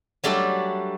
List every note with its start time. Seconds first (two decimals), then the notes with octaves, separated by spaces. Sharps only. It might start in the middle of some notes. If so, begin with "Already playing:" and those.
0.24 F#3 G3 A3 D4 F#4 A4